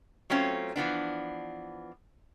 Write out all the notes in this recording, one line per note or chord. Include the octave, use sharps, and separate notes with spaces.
F#3 A3 C4 C#4 F4
E3 F3 B3 D4